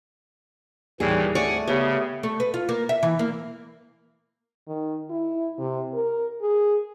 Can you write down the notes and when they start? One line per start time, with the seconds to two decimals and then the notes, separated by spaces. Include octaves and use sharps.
1.00 D#2 A2 E3 G3 G#4
1.35 A3 C#5 D5 F#5 G#5 C#6
1.68 C#3 B3 G4 C#5 E5
2.23 A3
2.40 B4
2.54 F4
2.69 A#3
2.89 E5
3.03 E3
3.19 A#3
4.68 D#3
5.10 E4
5.59 C3
5.94 A#4
6.41 G#4